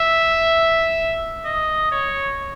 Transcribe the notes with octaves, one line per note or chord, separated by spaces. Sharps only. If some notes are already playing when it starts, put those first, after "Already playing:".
Already playing: E5
D#5
C#5